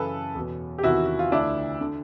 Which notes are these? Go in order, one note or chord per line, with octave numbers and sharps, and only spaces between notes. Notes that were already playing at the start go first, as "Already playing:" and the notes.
Already playing: F#2 C#3 E3 A4 B4
E2 B2
G4
E2 C3 D#3 E4 F#4
F#4
F4
D2 D3 D4 E4
D3